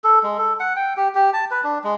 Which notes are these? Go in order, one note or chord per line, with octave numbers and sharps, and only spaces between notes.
A4
G#3
A4
F#5
G5
G4
G4
A5
B4
D4
G#3